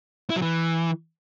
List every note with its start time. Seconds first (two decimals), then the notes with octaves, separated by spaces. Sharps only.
0.30 E4
0.36 F#3
0.42 E3